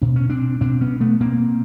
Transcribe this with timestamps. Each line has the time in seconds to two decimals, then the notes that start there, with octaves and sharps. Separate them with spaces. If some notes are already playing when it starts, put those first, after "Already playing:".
0.02 B2 D4
0.16 C#4
0.30 C4 D4
0.61 B2 C4 D4
0.81 B3 C#4
1.00 A3 B3
1.21 B2 A#3 C4